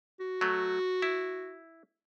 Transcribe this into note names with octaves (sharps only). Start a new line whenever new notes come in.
F#4
F#3 A3
E4